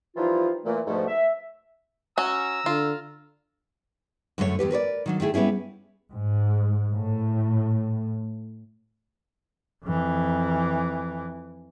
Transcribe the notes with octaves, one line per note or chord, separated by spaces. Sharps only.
E3 F3 G3 D#4 F4
A#2 E3 A3
G#2 B2 D3 F3 A3
E5
C#4 F#4 A#5 E6
D3 F4
F#2 D3 A3 G4 C#5
E2 G2 G4 B4
A#4 B4 C#5 D5
D#3 F#3 D4
D#3 A3 E4 G#4
G3 B3 C#4 E4 G#4
G#2
A2
F2 E3